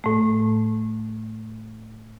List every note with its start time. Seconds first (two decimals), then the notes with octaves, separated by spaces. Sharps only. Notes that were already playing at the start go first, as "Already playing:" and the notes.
0.04 A2 A3